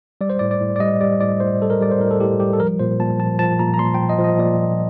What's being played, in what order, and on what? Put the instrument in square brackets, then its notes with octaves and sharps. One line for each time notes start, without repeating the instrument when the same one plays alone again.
[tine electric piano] G3 D5
C5
A2 D5
D5
A2
D5
G3 D#5
G3 D5
A2 D5
A2 C5
G3 A4
A#4
G3 D5
C5
A2 A#4
A4
A2 G4
G3 G4
A4
F3 A#4
A#2 C5
A#2 A5
F3 A5
F3 A5
A#2 A#5
A#5
A#2 C6
G5
F3
D#5
F3
D#5
A#2 D5
A#2